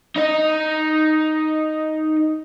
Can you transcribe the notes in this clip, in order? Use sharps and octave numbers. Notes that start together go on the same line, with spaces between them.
D#4 D#5